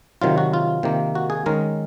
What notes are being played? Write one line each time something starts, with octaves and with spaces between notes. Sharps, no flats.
C3 D#3 F#3 F4
F#4
F4
C3 D#3 A#3
F#4
G#4
D#3 G#3 C#4 A#4